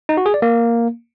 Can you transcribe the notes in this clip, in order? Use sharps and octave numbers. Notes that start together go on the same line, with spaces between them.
D#4
F#4
G#4
D5
A#3